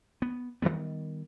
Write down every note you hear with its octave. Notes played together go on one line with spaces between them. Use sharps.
B3
D#3 F3 G3 B3